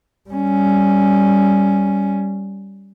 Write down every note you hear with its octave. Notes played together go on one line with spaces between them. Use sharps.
G3 C#4